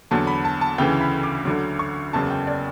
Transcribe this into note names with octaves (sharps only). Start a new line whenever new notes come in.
E2 D3 F#3 A5
B5
A5
A5
D2 C#3 E3 G5
B5
D6
D2 D3 F#3 D6
C#6
F#1 E2 C#3 F#3 A5
G5
D5